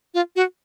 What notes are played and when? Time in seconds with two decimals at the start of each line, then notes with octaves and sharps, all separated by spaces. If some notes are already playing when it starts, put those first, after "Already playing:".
0.14 F4
0.36 F#4